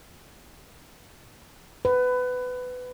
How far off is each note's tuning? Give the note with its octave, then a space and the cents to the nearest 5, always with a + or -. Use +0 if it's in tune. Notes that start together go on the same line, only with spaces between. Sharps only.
B4 +20